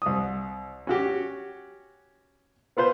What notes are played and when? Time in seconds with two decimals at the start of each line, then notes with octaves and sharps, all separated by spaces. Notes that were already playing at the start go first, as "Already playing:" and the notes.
0.02 C2 D#6
0.87 C#4 F#4 G4
2.77 B3 F4 B4 C5